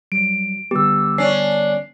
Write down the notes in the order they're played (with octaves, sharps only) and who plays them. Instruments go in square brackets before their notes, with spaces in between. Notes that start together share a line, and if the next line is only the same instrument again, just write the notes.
[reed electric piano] F#3 G3 [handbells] D7
[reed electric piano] D3 G3 B3 [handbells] G4 E6
[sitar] C#4 D4 [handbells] C7